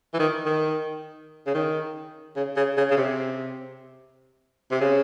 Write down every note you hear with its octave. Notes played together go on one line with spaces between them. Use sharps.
E3
D#3
D#3
C#3
D#3
C#3
C#3
C#3
C#3
C3
C3
C#3